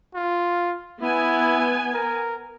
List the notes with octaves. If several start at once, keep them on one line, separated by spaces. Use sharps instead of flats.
F4
B3 E4 G#5
A#4